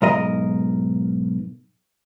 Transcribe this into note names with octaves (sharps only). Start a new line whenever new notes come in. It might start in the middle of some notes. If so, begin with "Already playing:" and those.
B1 G#2 A#4 D#5